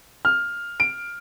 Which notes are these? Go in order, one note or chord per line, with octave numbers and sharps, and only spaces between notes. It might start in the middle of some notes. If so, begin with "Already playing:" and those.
F6
D7